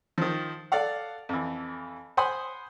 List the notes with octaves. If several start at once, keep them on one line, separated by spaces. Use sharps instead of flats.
D#3 F3
A4 D5 F5 F#5
F2 E3
C5 F#5 G#5 B5 C6 D#6